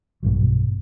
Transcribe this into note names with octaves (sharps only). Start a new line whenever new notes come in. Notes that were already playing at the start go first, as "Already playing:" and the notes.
B1 G2 B2 F#3